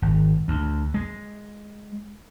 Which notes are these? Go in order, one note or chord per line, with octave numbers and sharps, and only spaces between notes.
G#1
D2
G#3